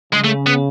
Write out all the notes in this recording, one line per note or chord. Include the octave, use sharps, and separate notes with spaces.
C#3 G#3
A3
B3